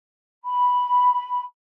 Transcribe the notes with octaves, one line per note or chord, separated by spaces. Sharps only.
B5